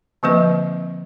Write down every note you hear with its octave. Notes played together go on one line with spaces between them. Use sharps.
D3 F3 A#3 C4 B4 D#5